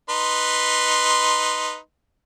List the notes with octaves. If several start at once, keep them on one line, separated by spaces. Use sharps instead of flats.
D#4 B4 C6